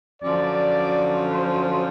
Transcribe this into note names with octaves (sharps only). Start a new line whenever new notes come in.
F#2 D3 F3 D5
C5